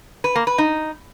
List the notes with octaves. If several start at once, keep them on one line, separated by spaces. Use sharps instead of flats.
B4
A#3
B4
D#4